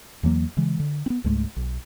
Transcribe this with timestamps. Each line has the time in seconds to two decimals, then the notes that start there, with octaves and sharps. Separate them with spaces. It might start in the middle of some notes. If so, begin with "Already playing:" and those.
0.23 E2 E3 F#3 A#3
0.57 C#3 E3 G#3
0.80 D3
1.06 B3 C4
1.24 C#2 G#2 G#3 A3
1.56 B1